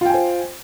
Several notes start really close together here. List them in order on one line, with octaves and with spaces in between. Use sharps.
F4 G5 G#5 C5